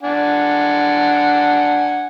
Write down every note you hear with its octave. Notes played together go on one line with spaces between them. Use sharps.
D4 F#5 G#5